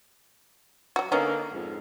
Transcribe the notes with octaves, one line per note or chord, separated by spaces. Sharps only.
F#3 F#4
D3 A#3 B3 C#4 D#4
F2 G#2